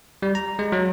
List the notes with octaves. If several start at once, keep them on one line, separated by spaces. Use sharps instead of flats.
G3
A#5
G#3
F#3